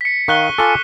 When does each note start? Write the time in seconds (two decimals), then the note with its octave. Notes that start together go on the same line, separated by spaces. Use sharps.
0.01 B6 C#7
0.28 D#3 F5 C#6 F#6 G7
0.58 F4 A4 G#5 D6 C#7 G7